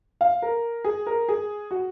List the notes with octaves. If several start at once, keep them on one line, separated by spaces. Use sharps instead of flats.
F5
A#4
G#4
A#4
G#4
F#4